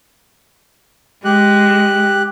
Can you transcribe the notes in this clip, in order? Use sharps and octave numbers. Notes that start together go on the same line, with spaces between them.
G#3 G4 F#6